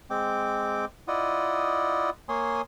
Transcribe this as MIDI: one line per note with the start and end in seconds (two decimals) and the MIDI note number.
0.10 0.85 56
0.10 0.85 60
0.10 0.85 79
0.10 0.85 86
1.08 2.10 64
1.08 2.10 65
1.08 2.10 74
1.08 2.10 75
1.08 2.10 78
1.08 2.10 87
2.29 2.61 58
2.29 2.61 73
2.29 2.61 80
2.29 2.61 84
2.29 2.61 87